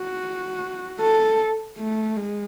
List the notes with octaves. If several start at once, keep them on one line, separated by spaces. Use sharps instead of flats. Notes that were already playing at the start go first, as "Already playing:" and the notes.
Already playing: F#4
A4
A3
G#3